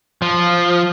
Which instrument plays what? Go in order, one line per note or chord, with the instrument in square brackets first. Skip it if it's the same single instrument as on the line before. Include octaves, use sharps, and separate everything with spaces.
[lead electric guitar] F3